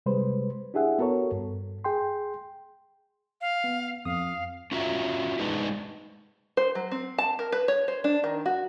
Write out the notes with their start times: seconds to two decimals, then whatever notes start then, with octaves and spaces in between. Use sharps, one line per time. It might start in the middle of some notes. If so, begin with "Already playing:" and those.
0.06 C3 G3 G#3 B4 C5
0.74 D4 E4 G4 G#4 E5 F#5
0.99 B3 F#4 A4 A#4 C#5
1.32 G2
1.84 G#4 G5 C6
3.41 F5
3.64 B3
4.05 F2 F5 D#6
4.72 C#4 F4 F#4 E5 A#5
5.39 G#3 D4 D#4 B4
6.57 C5
6.75 F#3
6.91 C4
7.18 A5
7.39 A#4
7.52 B4
7.68 C#5
7.88 C5
8.04 D4
8.24 D#3
8.46 F#4